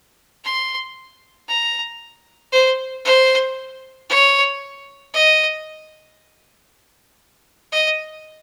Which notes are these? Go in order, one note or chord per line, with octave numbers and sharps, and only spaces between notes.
C6
A#5
C5
C5
C#5
D#5
D#5